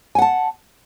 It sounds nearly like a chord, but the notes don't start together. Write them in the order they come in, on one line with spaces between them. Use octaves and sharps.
G#5 F#5 A5